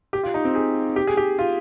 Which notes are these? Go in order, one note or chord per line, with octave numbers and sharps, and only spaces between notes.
G4
F4
D#4
C4
G#4
G4
G#4
G4
F4